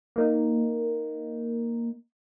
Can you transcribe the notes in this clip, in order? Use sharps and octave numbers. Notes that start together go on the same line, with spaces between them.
A#3 D#4